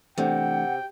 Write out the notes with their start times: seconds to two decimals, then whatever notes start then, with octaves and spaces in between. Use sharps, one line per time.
0.18 C3 E3 A3 D4 F#5 G5